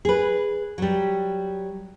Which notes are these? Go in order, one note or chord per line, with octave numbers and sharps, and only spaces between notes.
G#4 B4
F#3 G3